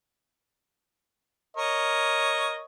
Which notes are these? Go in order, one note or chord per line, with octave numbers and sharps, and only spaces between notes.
A#4 C#5 D#5